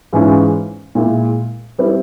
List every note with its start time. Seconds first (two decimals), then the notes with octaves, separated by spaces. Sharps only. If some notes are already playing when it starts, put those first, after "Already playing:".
0.13 G#2 E3 G#3 C#4 F4
0.95 A#2 G#3 E4
1.78 G3 C4 E4